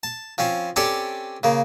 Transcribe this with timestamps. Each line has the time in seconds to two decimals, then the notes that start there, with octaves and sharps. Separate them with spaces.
0.03 A5
0.38 F3 C4 C#4
0.76 C4 C#4 G4 A4 C#5 D5
1.43 C#3 A#3